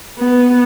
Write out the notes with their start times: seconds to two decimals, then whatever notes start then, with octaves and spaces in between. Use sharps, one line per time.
0.19 B3